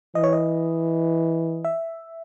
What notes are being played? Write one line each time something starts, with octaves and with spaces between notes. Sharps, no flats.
E3 D#5
C#5
D#5
E5